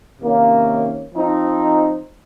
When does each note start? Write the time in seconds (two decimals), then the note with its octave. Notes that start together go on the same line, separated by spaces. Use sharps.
0.21 C3 D#3 A#3 C#4
1.14 F3 C4 D#4